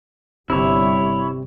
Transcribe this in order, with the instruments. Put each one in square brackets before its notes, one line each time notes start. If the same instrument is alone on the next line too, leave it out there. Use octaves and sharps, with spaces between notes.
[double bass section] G1 G3 [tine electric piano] C3 [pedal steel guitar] E4 C#5